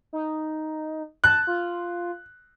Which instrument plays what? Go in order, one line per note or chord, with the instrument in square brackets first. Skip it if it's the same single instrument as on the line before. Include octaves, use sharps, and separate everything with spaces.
[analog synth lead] D#4
[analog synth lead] A5 [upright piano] F#6
[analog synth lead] F4